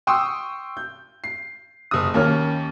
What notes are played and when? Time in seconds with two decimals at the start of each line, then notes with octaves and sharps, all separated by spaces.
0.07 G5 C6 C#6 D#6 E6
0.77 G6
1.24 C7
1.91 F#1 D#6
2.14 D#2 A#3 C#4 F6